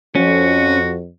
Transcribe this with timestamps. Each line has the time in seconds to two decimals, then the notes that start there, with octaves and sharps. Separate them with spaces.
0.15 F2 C#4 F#4